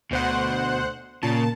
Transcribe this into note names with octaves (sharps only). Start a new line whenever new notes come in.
D2 B2 C5 F#5
A#2 C#3 A5